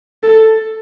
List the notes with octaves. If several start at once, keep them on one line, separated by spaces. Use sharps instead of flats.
A4